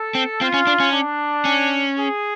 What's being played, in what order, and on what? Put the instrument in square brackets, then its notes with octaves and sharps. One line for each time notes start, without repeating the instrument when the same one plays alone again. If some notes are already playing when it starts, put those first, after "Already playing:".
Already playing: [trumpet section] A4
[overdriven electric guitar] C4
[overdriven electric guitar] C4 [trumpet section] F4
[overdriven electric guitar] C#4
D4
C#4
[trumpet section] D4
[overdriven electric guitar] C#4
[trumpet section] G#4